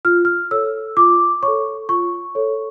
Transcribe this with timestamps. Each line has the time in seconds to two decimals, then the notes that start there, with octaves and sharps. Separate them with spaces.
0.05 F4 F6
0.25 F6
0.51 A4 C#5 E6
0.97 F4 D6
1.43 A4 C#5 C#6
1.89 F4 C#6
2.35 A4 C#5